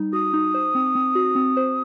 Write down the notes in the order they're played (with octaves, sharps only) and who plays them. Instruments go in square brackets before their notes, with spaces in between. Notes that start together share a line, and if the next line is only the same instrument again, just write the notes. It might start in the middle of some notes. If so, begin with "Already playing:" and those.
Already playing: [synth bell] G3 D#4
[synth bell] F#4 [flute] D#6
[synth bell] D#4
C5
C4
C4
F#4
C4
C5